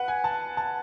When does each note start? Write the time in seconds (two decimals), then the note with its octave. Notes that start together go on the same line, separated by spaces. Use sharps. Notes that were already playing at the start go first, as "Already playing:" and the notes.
Already playing: B4 F#5
0.08 G#5
0.24 A5
0.57 A5